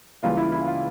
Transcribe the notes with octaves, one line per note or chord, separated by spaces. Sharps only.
C#2 C#3 E3 G3 A#3 F4
E4
E4
F4